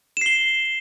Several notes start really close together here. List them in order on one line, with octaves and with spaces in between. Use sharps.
E7 C7 G7